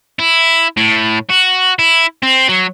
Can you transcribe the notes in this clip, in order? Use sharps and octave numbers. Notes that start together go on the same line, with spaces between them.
E4
A2
F#4
E4
C4
F#3